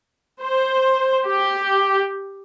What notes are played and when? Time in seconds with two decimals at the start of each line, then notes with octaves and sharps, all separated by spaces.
0.40 C5
1.27 G4